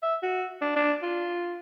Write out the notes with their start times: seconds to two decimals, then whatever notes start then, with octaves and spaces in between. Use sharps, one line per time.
0.02 E5
0.23 F#4
0.61 D4
0.76 D4
1.02 F4